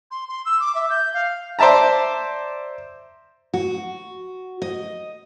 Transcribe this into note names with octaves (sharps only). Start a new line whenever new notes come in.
C6
C6
E6
D6
E5
G6
F5
C5 D5 E5 A5 A#5
F#4
D#5